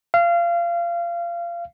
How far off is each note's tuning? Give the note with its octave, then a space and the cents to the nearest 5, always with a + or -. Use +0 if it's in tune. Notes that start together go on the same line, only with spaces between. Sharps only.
F5 -25